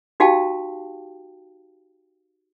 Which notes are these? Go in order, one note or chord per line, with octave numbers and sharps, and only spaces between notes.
D#4 F#4 G4 F5 G5 A5